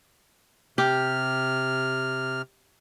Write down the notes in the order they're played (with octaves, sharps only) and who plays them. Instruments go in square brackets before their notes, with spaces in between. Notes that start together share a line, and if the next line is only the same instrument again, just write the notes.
[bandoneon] C3 F6 [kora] G4